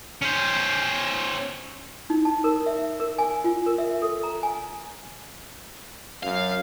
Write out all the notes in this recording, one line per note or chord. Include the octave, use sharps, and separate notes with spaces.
C#4 C5
D#4
A5
A#4
E5
A#4
G#5
F4
A#4
E5
A4
A#5
G#5
F#2 F5